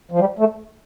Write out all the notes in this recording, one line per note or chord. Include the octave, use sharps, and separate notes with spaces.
F3
G3
A3